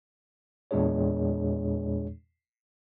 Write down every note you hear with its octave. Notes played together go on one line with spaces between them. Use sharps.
E2 A#2 G#3 D4 G#4 C#5